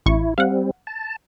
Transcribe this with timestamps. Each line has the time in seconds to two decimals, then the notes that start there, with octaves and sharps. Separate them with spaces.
0.06 A1 E4 C#6
0.38 G3 C4 F5 F#5
0.87 A5